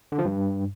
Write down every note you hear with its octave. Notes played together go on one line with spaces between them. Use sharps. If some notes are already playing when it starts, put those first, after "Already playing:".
D3
F3
G2